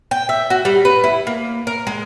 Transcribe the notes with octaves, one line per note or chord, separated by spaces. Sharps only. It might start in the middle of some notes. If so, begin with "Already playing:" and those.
G5
E5
F#4
G3
B4
E4
A#3
A#4
G#3